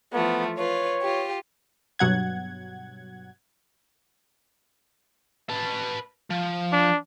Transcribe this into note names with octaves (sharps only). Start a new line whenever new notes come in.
E3 F3 A3 B3
F4 B4 C#5
F4 G4
G2 B2 F#3 F#5 G#6
B4 A5
F3
D4